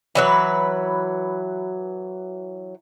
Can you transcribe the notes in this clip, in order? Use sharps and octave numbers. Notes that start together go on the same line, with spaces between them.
E3 F#3 B4